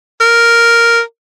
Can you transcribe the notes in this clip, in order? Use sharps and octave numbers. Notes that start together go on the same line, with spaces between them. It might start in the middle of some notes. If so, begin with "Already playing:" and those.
A#4